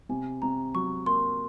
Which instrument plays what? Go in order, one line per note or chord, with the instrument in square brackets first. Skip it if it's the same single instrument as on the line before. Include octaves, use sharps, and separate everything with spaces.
[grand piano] C3 [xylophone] G#5
[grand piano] C3 [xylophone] A#5
[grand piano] F#3 [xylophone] C#6
[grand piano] A#3 [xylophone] C6